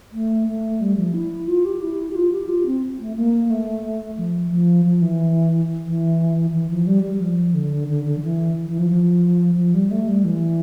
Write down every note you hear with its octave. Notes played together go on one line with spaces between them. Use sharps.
A3
A3
G3
F3
E4
F4
G4
E4
G4
F4
G4
F4
C4
A3
A#3
A3
F3
F3
F3
E3
E3
E3
F3
G3
G3
F3
D3
D3
D3
F3
E3
E3
F3
F3
F3
G3
A3
G3
E3